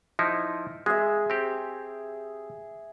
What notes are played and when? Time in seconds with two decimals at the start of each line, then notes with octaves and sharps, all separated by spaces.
0.19 F3 D#4 E4
0.86 G#3 G#4 E5
1.30 C4 G4